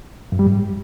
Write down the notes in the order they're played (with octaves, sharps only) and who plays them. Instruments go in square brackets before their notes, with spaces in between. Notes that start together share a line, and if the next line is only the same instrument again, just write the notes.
[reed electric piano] F#2
G3
G#2